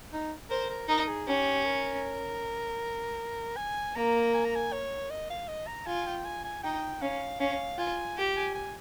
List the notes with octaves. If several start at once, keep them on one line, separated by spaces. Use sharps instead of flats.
D#4
A#4 C5
A#4
D#4 A#4
G#4
C#4 G4
A#4
G#5
A#3 A#5
G#5
A#5
G#5
C#5
D#5
F5
D#5
A#5
F4 G#5
G5
G#5
G#5
D#4 G5
C#4 F5
C#4 F5
F4 G#5
G4
G#5
G#5